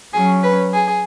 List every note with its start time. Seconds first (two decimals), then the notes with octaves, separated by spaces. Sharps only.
0.13 F#3 C#4 G#4
0.43 B4
0.73 G#4